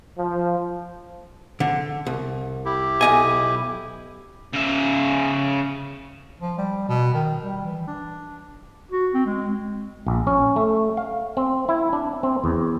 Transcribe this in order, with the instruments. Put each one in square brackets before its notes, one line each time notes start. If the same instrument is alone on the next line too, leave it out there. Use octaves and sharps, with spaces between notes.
[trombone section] F3
[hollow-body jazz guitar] D3
C2
[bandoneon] E4 G4
[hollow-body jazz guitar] B1 D#5 G#5
[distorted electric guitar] C#3 E5
[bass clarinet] F3
G3
B2
D#3
G3
E3
D4
[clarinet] F#4
C4
G#3
[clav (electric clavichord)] A#1
C#4
A3
F5
C4
E4
D4
C4
E2